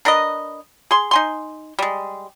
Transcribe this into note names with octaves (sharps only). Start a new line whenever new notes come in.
D4 A#4 B4 D#5
G#4 C6
D#4 G#5 C6
G3 G#3